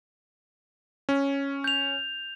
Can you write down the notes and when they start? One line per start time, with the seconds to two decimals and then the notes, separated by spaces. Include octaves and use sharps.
1.09 C#4
1.64 G6 F7